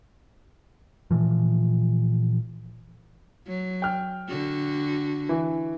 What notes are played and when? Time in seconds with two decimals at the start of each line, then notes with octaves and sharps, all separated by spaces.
1.11 A#2 E3 F3
3.47 F#3
3.82 G5 F6
4.29 D3 F#4
5.29 E3